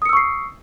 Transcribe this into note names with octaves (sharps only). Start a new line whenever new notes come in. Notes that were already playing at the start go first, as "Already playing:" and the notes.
C#6 D#6 E6 C7 C#7